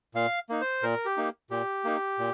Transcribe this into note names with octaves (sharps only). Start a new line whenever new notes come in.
A#2 F5
A#3 D#4
C5
A#2 A#4
G4
A#3 D#4
A#2 G4
A#3 D#4
A#2